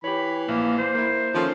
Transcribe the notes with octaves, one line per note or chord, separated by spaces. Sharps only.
E3 G4 C#5 B5
A#1 A#3
C5
A#3 E4
D#3 F3 C#4 A4